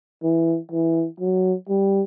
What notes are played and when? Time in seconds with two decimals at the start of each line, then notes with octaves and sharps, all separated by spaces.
0.23 E3
0.71 E3
1.20 F#3
1.69 G3